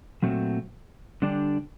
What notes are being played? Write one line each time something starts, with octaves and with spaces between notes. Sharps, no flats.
A#2 F#3 A3 C4 F#4
D3 G3 D4 G4